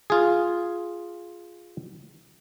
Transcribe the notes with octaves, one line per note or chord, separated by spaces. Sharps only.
F4 G#4